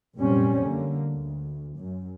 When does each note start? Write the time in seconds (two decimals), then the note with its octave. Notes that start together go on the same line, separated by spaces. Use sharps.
0.16 F1 F#2 A#2 G3 C4 C#4
0.61 D3 A#3
1.13 D2
1.78 F#2